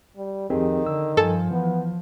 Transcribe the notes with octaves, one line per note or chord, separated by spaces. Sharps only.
G3
F2 D#3 C4 G4 G#4
D3 E6
G2 F3 A4 G#5
E3 B3